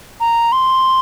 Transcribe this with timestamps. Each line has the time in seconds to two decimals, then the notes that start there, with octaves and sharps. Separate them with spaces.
0.20 A#5
0.52 C6